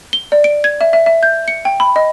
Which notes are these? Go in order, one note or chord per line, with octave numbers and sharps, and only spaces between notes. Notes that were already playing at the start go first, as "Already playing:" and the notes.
G7
D5
D7
G#6
E5
E5
E5
G6
C#7
G5
B5
D#5